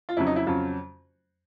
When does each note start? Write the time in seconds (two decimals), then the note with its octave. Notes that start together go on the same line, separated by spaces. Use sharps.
0.09 F4
0.17 F2 C#3 F#3 E4
0.27 D#4
0.36 E4
0.46 F2 C#3 F#3 F4